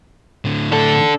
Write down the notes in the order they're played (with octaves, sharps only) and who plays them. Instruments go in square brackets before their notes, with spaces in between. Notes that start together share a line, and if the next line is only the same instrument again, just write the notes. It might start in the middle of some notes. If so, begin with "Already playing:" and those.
[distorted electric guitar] A2 D3
[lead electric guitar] D4 A4